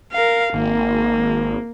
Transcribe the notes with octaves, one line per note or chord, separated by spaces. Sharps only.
A#4 F5
G#1 A#3